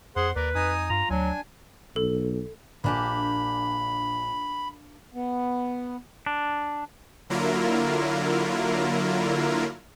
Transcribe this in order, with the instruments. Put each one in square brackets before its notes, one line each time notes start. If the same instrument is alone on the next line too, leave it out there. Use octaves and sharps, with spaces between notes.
[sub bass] F2 [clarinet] G#4 [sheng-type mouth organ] C5 F#5 C6
[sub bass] D#2 [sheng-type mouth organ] A#4 D5 [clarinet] B4
[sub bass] F2 [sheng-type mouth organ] D#4 G#5 D#6
[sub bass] G2 [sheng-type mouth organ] F4 [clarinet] A#5
[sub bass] D2 [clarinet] F#3 [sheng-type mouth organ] D4 G#5
[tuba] B1 [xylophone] A4
[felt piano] A#1 G#5 [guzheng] A#3 D4 G4 [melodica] B5
[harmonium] B3
[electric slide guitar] D4
[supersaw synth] D3 F#3 A#3 E4 F4 A#4